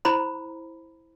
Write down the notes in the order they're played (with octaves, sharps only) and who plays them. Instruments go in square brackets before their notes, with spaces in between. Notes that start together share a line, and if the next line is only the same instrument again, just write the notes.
[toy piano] E4 C5 A#5 B5